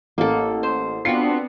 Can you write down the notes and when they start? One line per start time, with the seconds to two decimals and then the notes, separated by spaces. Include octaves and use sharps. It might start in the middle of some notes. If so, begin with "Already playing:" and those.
0.18 A1 A#3 A4
0.63 C5
1.05 B3 C4 D4 F4 F#4 C7 C#7